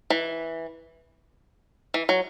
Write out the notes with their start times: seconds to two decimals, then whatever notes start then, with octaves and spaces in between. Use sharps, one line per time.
0.10 E3
1.94 E3
2.09 F#3